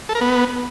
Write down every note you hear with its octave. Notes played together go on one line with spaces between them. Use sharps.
A4
A#4
B3